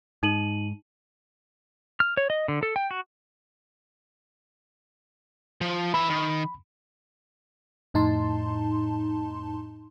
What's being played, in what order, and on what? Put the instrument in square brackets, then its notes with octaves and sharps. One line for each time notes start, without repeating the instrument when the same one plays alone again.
[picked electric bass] G#2 [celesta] D#4 D#7 F#7
[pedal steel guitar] F6
C#5
D#5
D3
A4
G5
F#4
[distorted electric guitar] F3
[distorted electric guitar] E3 E5 [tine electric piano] B5
[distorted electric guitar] D#3
[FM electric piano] F2 A2 D#4 A5 C6